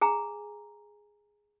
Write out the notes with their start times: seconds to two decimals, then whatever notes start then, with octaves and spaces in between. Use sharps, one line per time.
0.01 G#4 G#5 A#5